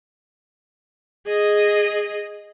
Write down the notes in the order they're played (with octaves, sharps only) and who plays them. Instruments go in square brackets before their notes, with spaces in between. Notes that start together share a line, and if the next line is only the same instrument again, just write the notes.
[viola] G#4 D#5